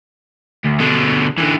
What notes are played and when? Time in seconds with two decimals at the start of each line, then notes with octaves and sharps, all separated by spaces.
0.65 D2
0.80 B2 D3
1.38 D3 E3